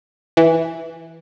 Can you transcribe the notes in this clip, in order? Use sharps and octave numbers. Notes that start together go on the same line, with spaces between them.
E3